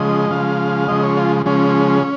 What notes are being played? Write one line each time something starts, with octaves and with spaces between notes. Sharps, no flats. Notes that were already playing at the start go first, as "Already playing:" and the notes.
Already playing: C#3 F3 G#3 D#5
C#3 F3 G#3 F5
C#3 F3 G#3 D#5
C#5
F4
C#3 F3 G#3 C#4